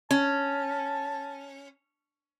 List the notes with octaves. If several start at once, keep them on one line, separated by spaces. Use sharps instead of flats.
C#4 A5